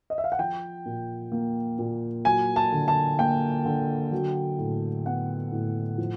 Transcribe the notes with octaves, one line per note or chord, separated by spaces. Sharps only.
D#5
E5
F5
F#5
F3 G5
A#2
A#3
A#2
F#3 G#5
A5
D3
A5
A#3 G5
D3
F#3
A2
B3 F#5
A2
F3